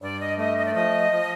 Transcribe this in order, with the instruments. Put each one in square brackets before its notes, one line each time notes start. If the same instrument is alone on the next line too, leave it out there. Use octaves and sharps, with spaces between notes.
[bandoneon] G2 [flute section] D5
[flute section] D#5
[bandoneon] A3 [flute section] D#5
[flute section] D#5
D5
[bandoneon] F3 [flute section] D#5
[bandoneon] F3